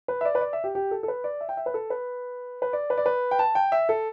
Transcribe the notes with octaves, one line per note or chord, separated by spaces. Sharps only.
B4
E5
D5
B4
D5
E5
G4
G4
A4
A4
B4
D5
E5
G5
E5
B4
A4
B4
B4
D5
B4
D5
B4
G5
A5
G5
E5
A4